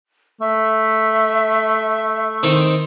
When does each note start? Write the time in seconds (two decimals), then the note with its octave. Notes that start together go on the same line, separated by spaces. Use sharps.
0.41 A3 E5
2.43 D#3 C4